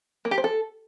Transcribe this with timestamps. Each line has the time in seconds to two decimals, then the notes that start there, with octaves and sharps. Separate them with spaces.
0.25 A#3
0.31 G4
0.38 C5
0.44 A4